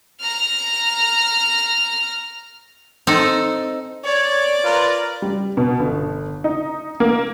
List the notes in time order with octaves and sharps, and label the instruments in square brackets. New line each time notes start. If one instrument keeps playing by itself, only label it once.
[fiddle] A#5 F6
[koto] C4 D#4 A4
[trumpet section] C#5 [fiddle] D5
[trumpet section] F4 A#4 B4
[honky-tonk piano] G3
B2
G1
D#4
A#3